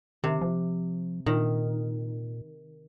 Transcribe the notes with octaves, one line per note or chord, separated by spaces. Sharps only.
C3 D#3
F3
A#2 D#3